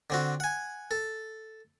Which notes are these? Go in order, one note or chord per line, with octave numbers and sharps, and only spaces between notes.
D3 C4 F#4
F#5 G#5
A4